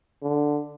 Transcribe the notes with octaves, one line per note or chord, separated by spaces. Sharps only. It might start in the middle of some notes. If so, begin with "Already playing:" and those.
D3